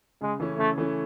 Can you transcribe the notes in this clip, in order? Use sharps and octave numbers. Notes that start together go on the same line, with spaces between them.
C#3 G#3
E3 A3 C#4
C#3 A3
E3 A3 C#4